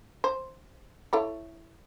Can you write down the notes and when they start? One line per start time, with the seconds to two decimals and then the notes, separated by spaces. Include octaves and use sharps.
0.24 C5
1.13 E4 A4 C#5